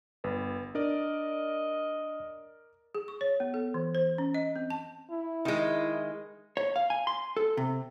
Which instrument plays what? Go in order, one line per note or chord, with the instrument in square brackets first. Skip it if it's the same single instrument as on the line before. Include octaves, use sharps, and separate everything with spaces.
[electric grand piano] G1 [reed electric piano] B4
[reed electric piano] D4 [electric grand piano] A#4 D5 [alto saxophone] D#5
[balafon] G#4
C#6
C#5
B3
A4
E3
C5
C#4
D#5
C4
A5
[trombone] E4
[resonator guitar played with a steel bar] D#3 G#3
[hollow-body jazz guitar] C#5
F5
G#5
C6
A4
C3